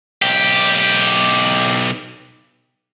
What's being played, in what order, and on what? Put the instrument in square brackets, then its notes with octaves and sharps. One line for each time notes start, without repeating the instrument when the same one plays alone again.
[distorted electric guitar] B1 G4